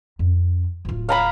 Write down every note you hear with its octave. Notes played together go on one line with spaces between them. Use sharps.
F2
D1 F4
F5 A#5 B5